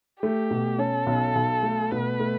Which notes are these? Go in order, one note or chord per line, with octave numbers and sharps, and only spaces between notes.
A3 G4
B2
C#4 A4
B1
B1
A3
B2 B4
A3